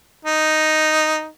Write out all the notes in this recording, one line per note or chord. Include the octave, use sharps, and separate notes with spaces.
D#4